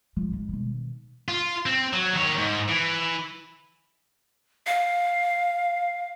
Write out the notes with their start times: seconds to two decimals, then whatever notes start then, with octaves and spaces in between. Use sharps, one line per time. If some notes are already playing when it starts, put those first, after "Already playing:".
0.16 F3
0.31 G#1 G#3
0.49 B2 D#3
1.28 F4
1.66 C4
1.93 F#3
2.14 D#3 C#5
2.38 G#2
2.69 E3
4.67 F5